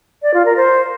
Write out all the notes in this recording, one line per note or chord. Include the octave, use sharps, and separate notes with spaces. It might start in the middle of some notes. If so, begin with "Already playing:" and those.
D5
F4
A#4
C5